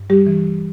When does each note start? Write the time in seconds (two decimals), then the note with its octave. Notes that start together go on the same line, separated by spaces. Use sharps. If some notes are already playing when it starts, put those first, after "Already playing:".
Already playing: G2
0.10 G3 G4
0.27 E3